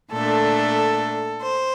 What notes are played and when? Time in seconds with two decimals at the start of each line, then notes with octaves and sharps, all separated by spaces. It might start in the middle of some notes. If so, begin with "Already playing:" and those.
0.12 A#2 A3 D4 A4
1.42 C5